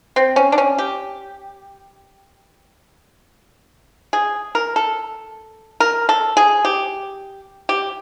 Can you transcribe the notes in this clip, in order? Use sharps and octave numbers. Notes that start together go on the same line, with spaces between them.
C4
C#4
D4
C#4
G4
G#4
A#4
A4
A#4
A4
G#4
G4
G4